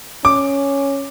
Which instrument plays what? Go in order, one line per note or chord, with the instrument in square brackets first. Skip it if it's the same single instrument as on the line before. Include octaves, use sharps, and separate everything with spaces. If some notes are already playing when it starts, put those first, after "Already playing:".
[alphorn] C#4 [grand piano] D6